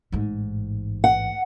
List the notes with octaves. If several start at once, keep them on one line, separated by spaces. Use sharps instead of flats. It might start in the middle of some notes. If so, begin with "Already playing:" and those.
A1 G#2
F#5